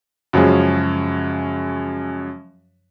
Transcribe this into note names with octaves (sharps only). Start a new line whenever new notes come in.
F#2 C#3 F3 F#3 G#3 C#4